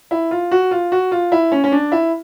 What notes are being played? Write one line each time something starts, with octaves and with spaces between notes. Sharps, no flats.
E4
F4
F#4
F4
F#4
F4
E4
C#4
C#4
D4
E4